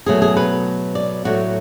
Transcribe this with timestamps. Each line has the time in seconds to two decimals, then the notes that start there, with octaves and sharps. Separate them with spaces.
0.06 B2 F#3 A3 G#4
0.22 G#4
0.37 B4
0.95 D5
1.25 A2 F#3 A3 F#4